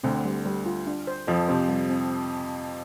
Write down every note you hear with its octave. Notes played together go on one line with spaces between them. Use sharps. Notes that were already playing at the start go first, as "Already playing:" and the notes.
D2 D3 C4
G3
G3
F4
D4
C5
F2 F3 A4
C3 C5
G3
C4